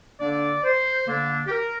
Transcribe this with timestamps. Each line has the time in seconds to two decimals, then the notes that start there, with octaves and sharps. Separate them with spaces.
0.19 D3 A#3 D4 D5
0.63 C5
1.07 D3 A#3 D4
1.46 G4
1.50 A#4